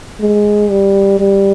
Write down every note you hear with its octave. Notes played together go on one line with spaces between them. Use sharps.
G#3
G3
G3